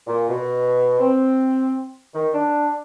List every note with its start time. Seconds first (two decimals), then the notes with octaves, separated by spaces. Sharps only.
0.07 A#2
0.27 B2
1.00 C4
2.14 D#3
2.33 D4